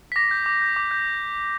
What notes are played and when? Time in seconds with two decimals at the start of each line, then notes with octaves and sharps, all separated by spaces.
0.12 B6
0.16 D6 A#6
0.31 G6
0.46 D6
0.62 G6
0.76 D6
0.91 G6